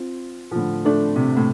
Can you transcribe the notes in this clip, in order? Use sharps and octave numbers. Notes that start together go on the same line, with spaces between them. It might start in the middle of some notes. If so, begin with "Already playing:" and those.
Already playing: C4 F4
F3
A2 D3
A3 D4
C3
A2